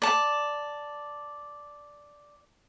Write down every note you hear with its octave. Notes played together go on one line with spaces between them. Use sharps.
D5 A5